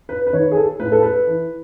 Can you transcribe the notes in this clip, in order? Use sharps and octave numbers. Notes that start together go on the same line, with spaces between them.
B4
B4
D#3 C#5
G#4
A4
A2 B4
A4
B4
E3